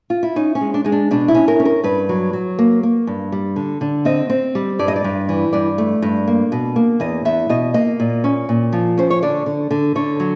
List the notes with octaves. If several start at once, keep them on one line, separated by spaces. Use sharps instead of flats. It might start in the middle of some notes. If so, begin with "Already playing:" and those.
F4
E4
C#4 D#4
C#4
G#3
D4
G#3 D#4
D4
B2 D4
E4
C#4
A#4
C#4
A#4
G2 B4
F#3
F#3
A#3
A#3
G2
G3
D3
D3
C4 D#5
C4
G3
G2 D5
D#5
D5
G2
E3
G2 D5
A3
G2
A#3
B2
A#3
E2 D#5
E2 E5
B2 D#5
A#3 D#5
A#2
C#4
A#2
F3
C#4 C5
C#5
D3 D5
D3
D3
D3 C#5
F#3